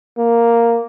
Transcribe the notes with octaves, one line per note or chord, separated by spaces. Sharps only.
A#3